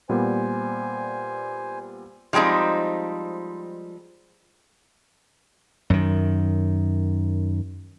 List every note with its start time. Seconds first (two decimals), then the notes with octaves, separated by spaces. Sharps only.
0.09 A#2 G3 B3 C5 G#5
2.33 F3 G3 G#3 C4 D#4
5.90 F#2 D#3